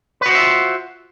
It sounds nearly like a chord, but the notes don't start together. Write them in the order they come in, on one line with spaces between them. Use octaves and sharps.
B4 F#4 C5 E5 F4